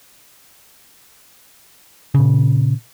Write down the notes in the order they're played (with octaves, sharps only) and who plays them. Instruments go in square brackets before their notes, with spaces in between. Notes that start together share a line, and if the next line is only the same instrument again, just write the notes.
[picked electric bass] A#2 C#3